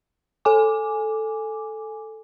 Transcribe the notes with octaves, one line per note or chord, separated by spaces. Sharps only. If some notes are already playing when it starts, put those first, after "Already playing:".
A4 G#5 D6